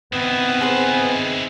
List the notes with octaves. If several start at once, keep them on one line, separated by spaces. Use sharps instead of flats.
D#3 B3 C4 E4
G#4 B4 C5